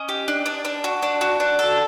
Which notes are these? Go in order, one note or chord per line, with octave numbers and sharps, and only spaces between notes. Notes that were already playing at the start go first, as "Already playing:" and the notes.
Already playing: C#4 D#5
G4
D4
D4
D4
F#4
D4
F#4
D4
A4